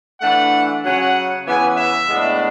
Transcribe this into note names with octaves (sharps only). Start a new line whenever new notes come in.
E3 A3 D4 F#5
C#3 F#3 C#4 F#5
C#3 E3 B3 G#5
E5
A2 G#3 B3 D4